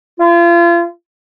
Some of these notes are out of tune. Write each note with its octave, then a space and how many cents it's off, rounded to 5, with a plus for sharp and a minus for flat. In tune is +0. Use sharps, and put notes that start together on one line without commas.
F4 -35